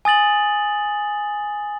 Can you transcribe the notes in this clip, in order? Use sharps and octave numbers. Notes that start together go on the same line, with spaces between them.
G#5 D#6 A6 F#7